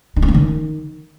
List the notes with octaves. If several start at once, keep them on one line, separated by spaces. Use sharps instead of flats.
D#4
C#4
A#3
D#3